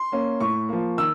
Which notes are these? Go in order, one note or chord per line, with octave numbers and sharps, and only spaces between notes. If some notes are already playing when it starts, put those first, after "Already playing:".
Already playing: C6
A#3 C#4
A2 C#6
F3 A#3
D#3 E6